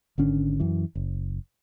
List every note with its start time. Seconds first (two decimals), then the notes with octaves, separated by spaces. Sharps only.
0.18 G#1 D3 C#4 D4
0.60 F#2 E3
0.95 F#1